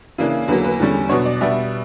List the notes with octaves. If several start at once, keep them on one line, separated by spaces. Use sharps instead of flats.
C#3 E3 A#3 D4
E2 D3 F#3 A#3 B4
B4
E2 D3 G3 C#4
B2 F#3 B3 D4 C#5
D5
B2 G3 B3 D4 E5